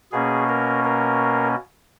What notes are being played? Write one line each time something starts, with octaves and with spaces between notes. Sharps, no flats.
B2 A#3 C#4 G#4
A#4
A#4